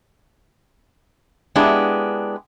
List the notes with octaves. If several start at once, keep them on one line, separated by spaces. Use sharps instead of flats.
G#3 B3 D4 E4 G4